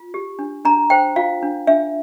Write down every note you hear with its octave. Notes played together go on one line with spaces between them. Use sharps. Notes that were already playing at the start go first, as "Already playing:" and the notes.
Already playing: F4
G4
D4
D4 A#5
C5 G5
F4 F5
D4
D4 E5